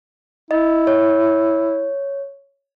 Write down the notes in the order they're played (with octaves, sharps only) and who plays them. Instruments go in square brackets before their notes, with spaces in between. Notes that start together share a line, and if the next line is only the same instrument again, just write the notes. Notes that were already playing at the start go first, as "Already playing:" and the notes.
[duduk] E4 [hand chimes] D#5
[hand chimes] C#5